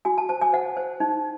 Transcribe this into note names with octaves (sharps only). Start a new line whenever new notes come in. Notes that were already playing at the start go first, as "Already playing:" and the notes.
F#4 G#5
A5
C5 A5
G#5
C5 F#5
C5
D#4